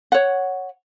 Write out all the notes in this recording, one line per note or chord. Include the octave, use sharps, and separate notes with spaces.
C#5 F#5